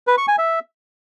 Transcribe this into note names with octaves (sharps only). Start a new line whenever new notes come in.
B4
C#6
G#5
E5